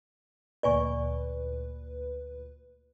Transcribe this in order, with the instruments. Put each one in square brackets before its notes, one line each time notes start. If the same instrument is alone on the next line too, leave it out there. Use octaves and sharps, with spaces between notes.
[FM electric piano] D2 A#2 B4 [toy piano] D5 G#5 C#6